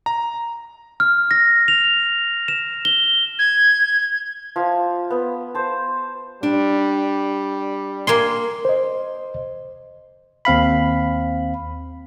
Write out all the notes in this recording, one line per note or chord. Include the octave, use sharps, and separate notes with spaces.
A#5
F6
A#6
F7
E7
G7
G#6
F3
B3
C5 A5
G3 D4
A#3 G#5 C6
C5 D#5
D#2 C4 F5 B5